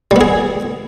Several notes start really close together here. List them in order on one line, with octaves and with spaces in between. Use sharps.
G3 B3 G#4